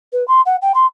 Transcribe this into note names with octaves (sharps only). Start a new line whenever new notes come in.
B4
C6
F#5
G5
C6